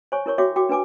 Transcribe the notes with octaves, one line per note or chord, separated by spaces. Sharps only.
C5 C#5 G#5 C#6
E4 A#4 C#5 C#6
F#4 C#5 E5 G5 D6
F#4 G5 D6
D4 B4 G#5 D6